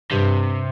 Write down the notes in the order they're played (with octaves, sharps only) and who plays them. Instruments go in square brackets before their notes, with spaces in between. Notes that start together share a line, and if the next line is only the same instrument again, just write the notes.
[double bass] G2 [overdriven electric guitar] C3